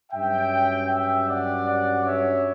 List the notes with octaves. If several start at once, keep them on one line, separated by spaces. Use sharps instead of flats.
G2 F#3 C#4 E5 G5
E5 G5
D5 F#5
D5 F#5
C#5 E5